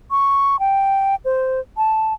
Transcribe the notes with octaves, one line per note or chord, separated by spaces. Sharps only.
C#6
G5
C5
A5